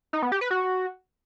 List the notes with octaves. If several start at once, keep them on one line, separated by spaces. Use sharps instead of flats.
D#4
B3
G4
B4
F#4